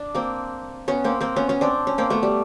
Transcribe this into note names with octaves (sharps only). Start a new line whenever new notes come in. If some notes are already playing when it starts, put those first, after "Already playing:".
Already playing: D4
A#3 C4
B3 C#4
A#3 C4
A#3 C4
B3 C#4
B3 C#4
C4 D4
C#4
A#3 C4
A3 B3
G3